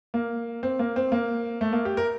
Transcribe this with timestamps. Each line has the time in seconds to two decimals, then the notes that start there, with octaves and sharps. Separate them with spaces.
0.14 A#3
0.63 C4
0.79 A#3
0.96 C4
1.12 A#3
1.61 A3
1.73 A#3
1.85 G4
1.97 A#4